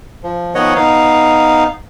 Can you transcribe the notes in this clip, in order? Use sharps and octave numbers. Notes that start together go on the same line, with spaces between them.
F3
D#3 F3 B3 C#5 D#5 F#5
B3 D#4 F5